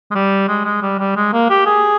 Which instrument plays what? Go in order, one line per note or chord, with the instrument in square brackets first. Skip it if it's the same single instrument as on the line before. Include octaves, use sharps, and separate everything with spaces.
[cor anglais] G#3
G3
G#3
G#3
G3
G3
G#3
A#3
G4
G#4